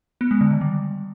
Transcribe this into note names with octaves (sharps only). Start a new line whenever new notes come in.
B3
G#3
D3
D#3
G3